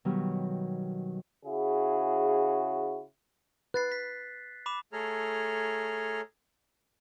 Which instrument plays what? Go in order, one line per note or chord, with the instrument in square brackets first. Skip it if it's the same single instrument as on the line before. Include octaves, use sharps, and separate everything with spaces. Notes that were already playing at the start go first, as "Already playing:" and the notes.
[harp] B2 D#3 F#3 G3
[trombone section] C#3 E4 F#4 G#4
[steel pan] B4 [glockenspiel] F#6 A6 C7
[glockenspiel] B6
B5 D6 E7
[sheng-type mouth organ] A3 G#4 A4 C#5 A#5 F6